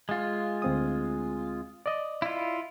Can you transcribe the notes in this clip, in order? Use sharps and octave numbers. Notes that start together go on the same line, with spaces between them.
G#3 F4
D2 C4 D#6
D5 D#5
E4 F4